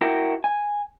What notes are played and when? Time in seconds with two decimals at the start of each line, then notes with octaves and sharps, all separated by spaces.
0.01 E4 F#4 A#4 G5
0.44 G#5